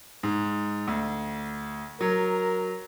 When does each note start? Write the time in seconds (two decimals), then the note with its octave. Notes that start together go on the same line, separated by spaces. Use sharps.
0.23 G#2
0.88 D2
2.01 F#3 A#4